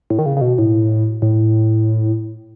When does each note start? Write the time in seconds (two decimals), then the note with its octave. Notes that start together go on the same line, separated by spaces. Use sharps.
0.10 A2
0.19 D#3
0.26 C#3
0.37 C#3
0.41 B2
0.58 A2
1.22 A2